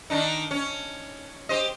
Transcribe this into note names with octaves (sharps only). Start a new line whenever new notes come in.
D#3 D4 D#4
C#4
G4 C5 D#5